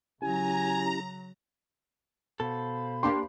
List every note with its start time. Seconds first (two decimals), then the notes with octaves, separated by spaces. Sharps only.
0.22 C#3 F#3 C#4 E4 G4 G#5 A#5
2.40 B2 A4 C5 F5 B5
3.03 A#3 D4 G4 C6